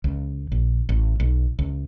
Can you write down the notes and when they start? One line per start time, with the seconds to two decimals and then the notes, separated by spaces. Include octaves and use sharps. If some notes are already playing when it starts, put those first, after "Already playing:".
0.04 C#2
0.52 A#1
0.89 A1
1.20 B1
1.59 C#2